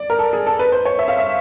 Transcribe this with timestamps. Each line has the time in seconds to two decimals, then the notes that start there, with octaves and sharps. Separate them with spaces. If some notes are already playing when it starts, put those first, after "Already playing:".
Already playing: D5
0.10 A#4
0.19 A4
0.33 G#4
0.46 A4
0.59 B4
0.72 C5
0.85 C#5
0.99 E5
1.08 F5
1.18 E5